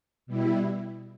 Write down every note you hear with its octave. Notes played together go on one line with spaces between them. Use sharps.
B2 G3 E4